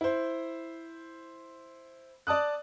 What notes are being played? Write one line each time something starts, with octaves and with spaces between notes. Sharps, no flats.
E4 C5
D5 A5 D#6 F#6